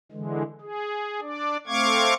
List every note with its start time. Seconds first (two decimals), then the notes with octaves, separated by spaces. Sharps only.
0.12 D3 E3 G#3
0.61 G#4
1.21 D4 D5
1.67 A3 C4 F5 C#6 D6 G#6